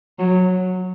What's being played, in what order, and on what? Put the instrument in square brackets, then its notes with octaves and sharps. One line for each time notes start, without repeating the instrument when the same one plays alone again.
[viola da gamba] F#3